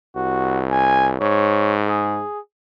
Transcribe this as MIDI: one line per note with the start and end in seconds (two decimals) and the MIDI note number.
0.16 1.19 36
0.16 0.61 66
0.71 1.10 80
1.21 2.23 44
1.21 1.76 73
1.88 2.39 68